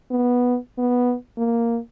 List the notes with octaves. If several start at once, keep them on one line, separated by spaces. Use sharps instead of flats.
B3
B3
A#3